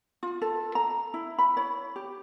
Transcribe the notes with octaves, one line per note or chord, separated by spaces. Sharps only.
F4
A4
A#5
E4
B5
C#5
G4